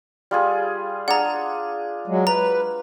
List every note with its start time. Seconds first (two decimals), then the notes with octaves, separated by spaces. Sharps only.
0.31 G3 F4 G#4
1.08 D4 G#4 F#5 A#5
2.07 F#3 G#3
2.27 B4 A#5